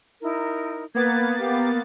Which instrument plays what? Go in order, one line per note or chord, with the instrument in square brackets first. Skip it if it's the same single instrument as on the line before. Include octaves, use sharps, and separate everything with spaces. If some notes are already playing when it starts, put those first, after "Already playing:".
[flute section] D#4 E4 A#4
[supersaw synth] A#3 B3 A6 [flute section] B4 G#6
[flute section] G4 F5